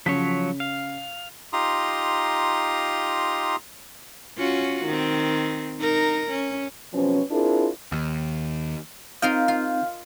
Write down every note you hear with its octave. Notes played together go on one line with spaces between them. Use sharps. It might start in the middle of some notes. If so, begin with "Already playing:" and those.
C#3 F3 F#3 C#5 B6
F5
D#4 F4 G4 A#5 C6 D#6
C#4 F4 F#4
D#3 C4
D#4 A#4
C#4
C3 F3 F#3 B3 C#4
C4 D4 E4 F4 G#4 A#4
D#2
C4 D#4 F4 A#4 D#5 F5 F6 G6
F4